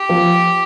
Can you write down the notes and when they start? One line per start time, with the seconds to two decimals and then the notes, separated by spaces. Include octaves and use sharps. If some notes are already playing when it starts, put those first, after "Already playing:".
Already playing: G4
0.09 F3